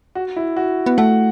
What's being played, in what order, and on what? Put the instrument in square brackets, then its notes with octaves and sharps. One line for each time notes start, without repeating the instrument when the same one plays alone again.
[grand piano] F#4
E4
F#4
[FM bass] B3
[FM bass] A3 [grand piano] F#5